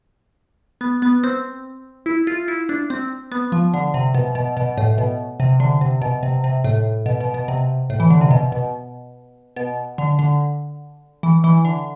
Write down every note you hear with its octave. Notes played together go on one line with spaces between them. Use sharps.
B3
B3
C4
E4
F4
E4
D4
C4
B3
F3
D3
C3
B2
B2
B2
A2
B2
C3
D3
C3
B2
C3
C3
A2
B2
B2
B2
C3
A2
E3
D3
C3
B2
B2
B2
D3
D3
E3
E3
D3